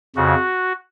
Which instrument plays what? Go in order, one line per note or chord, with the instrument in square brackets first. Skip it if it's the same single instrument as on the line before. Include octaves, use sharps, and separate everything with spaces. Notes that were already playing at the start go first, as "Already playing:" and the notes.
[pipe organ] F2 C#3 F#4